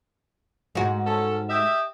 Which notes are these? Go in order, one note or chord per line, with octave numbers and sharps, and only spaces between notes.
G#2 F#4
C#4 A4
G4 D#5 E5